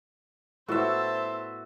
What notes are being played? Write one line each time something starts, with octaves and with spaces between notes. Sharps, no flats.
A2 B3 F#4 C5 E5 A5 E6